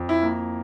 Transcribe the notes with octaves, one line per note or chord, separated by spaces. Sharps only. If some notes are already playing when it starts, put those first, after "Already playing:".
Already playing: F2
E4
A#3